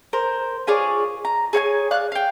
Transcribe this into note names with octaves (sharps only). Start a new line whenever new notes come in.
A#4 C5
F4 G#4 C#5 D5
A#5
G#4 C#5 F5 G#5
D5 F5 F#6
F5 G5